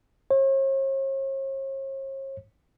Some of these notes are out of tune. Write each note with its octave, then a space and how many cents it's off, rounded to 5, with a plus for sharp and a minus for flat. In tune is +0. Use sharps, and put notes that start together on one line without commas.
C#5 -45